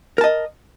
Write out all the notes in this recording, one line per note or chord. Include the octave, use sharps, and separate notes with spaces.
A#4 D#5 A5